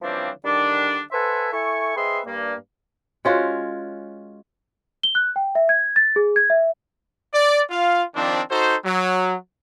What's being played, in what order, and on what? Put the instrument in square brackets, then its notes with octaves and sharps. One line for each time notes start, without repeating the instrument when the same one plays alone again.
[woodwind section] C#3 E3 F3 G3 C4 D4
D3 D#3 G3 D4
A4 B4 C5 E5 F#5 G#5
E4 A4 E5 G#5 C#6
C4 G#4 B4 D#5 E5 C6
G2 A#3
[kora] G#3 C#4 F4 F#4
[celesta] G7
F#6
G5
E5
G#6
A6
G#4
G#6
E5
[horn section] D5
F4 F5
D#3 F3 C4 D4
D#4 F#4 A4 C5
F#3